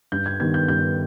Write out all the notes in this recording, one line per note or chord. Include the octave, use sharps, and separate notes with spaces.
G2 G6
G#6
D#3 G3 B3 G#6
G6
G2 G6